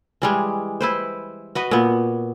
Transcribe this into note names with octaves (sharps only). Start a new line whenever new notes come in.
E3 G3 G#3
E4 B4 C5
F#4 B4 D#5
A#2 B3